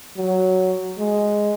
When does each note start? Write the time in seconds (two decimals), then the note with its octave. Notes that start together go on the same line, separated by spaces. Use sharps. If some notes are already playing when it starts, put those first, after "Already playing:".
0.17 F#3
0.98 G#3